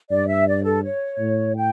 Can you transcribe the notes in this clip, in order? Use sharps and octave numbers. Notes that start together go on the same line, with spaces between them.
G2 D5
E5
D5
A4
C#5
A2
G5